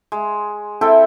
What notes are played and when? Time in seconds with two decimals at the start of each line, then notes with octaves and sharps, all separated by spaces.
0.12 G#3
0.81 C4 E4 A4 G5